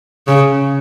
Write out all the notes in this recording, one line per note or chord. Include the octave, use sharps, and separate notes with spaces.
C#3